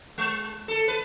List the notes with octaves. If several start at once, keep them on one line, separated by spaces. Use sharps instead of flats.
G#3
A4
B4